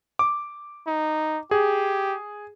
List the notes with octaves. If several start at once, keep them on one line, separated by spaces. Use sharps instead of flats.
D6
D#4
G4 G#4